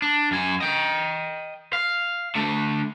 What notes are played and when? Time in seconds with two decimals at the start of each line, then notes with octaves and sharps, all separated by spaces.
0.02 D4
0.31 F#2 G#5
0.60 D#5 G5
1.73 F5
2.35 D3 A3